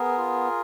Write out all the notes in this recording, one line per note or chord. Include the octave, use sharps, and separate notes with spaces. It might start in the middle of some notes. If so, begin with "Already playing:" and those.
Already playing: B3 G#4 A#4
F4